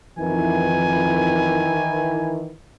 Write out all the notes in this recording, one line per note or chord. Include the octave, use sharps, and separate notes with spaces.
F2 D#3 E3 G#5